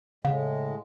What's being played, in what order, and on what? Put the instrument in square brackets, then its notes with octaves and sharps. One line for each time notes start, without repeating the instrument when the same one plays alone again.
[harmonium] A2 G#3 [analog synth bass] C#3 [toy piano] F5